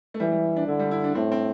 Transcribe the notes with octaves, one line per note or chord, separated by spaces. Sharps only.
A3
E3 G3
G3
D4
D3 E4
G3
E4
D4
A2 C4
C4